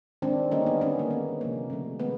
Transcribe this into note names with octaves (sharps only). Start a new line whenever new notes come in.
D#3 G#3 C4 D4
D3 G3 A#3 C#4 D#4
B3
D#3 G#3 B3 C#4
A#3
D#3 G#3 B3
C3 F3 A#3
C#3 F3 A3
D#3 G#3 B3